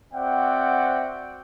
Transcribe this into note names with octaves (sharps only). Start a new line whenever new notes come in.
C4 F#4 D5 E5 F#5 G5